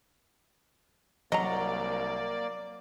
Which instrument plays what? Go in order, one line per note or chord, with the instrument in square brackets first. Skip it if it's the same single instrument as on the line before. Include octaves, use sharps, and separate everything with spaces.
[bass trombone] C2 [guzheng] F#3 [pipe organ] A#3 D5 [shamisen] D#5 A#5